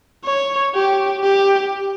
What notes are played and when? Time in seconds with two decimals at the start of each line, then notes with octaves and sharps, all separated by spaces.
0.25 C#5
0.75 G4
1.24 G4